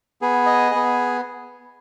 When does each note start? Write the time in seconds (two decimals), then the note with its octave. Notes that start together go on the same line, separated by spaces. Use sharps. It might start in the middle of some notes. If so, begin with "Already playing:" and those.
0.22 B3 G#4
0.46 D#5
0.71 B3 G#4